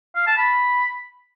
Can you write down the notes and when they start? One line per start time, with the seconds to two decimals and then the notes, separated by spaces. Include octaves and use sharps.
0.16 F5
0.27 A5
0.38 B5